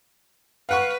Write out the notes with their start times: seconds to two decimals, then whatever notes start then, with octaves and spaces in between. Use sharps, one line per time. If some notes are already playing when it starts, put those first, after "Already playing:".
0.69 B4 F5 F#5 C#6